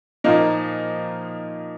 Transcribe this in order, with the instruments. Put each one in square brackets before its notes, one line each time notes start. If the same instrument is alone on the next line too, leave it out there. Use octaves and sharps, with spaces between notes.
[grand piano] A#2 F3 A#3 D#4